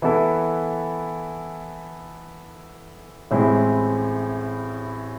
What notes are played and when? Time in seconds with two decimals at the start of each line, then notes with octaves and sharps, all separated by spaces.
0.02 E3 B3 E4 A4 E5
3.31 A1 A2 G#3 C4 E4